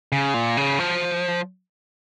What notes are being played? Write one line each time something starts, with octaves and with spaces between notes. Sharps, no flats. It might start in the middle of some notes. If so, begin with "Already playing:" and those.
C#3
A#2
C#3
F3